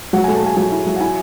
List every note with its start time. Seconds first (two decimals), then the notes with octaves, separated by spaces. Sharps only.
0.13 F#3 F#5
0.24 A3 G#5
0.35 A5
0.42 A3 G#5
0.57 F#3 G#5
0.71 E4
0.86 F#3
0.96 F#5
1.00 E4 G#5